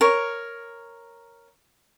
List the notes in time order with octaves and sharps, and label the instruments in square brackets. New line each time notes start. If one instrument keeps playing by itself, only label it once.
[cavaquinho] A#4 C#5